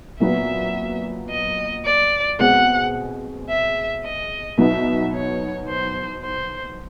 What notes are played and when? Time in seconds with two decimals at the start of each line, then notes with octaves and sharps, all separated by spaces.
0.20 A#2 F#3 B3 E5
1.29 D#5
1.85 D5
2.39 B2 G#3 C4 F#5
3.49 E5
4.04 D#5
4.57 B2 F#3 B3 D#4 E5
5.13 C#5
5.68 C5
6.22 C5